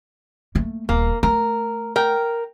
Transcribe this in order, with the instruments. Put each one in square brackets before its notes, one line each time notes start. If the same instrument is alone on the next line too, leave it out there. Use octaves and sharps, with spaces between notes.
[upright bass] A3 A#3
[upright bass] D#1 [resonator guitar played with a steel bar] A#3
[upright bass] A3 [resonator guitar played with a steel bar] A#4
[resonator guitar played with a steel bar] A#4 G5